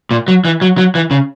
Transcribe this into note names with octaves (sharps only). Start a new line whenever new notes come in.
A#2
F#3
E3
F#3
F#3
E3
C#3